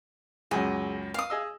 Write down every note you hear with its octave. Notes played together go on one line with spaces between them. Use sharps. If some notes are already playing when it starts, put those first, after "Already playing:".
C#2 F#2 G#4
F5 D#6
G#4 D#5 E6